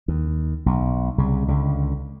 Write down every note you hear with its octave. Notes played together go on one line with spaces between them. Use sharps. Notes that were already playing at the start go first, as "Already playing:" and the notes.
D#2
B1
C2 C#3
C#2 D3